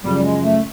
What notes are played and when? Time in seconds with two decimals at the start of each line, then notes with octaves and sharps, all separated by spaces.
0.04 F#2 C#3 F3 G3
0.23 G#3
0.43 A3